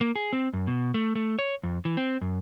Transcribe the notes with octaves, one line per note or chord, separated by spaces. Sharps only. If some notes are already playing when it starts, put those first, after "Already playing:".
A#3
G#4
C4
F#2
B2
A3
A3
C#5
F2
E3
C4
F#2